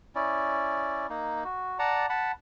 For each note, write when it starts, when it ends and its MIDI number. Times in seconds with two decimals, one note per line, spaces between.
0.15 1.07 61
0.15 1.07 64
0.15 1.07 74
1.10 1.44 58
1.10 1.44 63
1.44 1.78 66
1.79 2.06 74
1.79 2.06 78
1.79 2.06 81
1.79 2.06 82
2.09 2.32 78
2.09 2.32 81
2.09 2.32 83